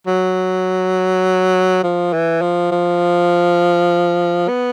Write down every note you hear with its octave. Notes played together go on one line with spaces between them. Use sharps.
F#3
F3
E3
F3
F3
B3